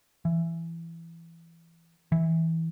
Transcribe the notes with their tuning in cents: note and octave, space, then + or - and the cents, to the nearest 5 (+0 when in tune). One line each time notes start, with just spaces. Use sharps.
E3 +15
E3 -15